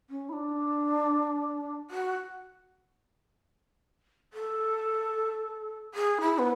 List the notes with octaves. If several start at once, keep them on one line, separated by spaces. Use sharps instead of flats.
C#4
E4
D4
F#4
A4
G#4
E4
B3